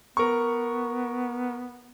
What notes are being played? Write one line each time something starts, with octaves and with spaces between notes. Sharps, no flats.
B3 A#4 C#6